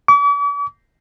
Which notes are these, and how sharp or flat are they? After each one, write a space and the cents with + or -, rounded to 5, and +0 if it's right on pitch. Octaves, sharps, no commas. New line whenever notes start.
D6 -45